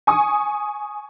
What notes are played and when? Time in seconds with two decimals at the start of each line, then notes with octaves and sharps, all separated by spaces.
0.07 G#5 C#6 D#6